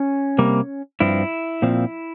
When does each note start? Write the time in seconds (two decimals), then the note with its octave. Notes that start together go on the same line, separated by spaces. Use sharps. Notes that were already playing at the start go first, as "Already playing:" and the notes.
Already playing: C#4
0.38 C3 G3 A#3
1.00 G2 F3 C4 E4
1.62 A#2 F3 C4